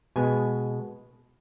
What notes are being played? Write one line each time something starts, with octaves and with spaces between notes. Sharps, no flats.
B2 G#3 B3 G#5